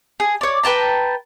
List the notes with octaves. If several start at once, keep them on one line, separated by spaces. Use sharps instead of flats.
G#4
C#5 D5
B4 G5 A5 A#5